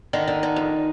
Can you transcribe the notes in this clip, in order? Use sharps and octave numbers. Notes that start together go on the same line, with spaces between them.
D3 D#3 D#4
D3
D3
F2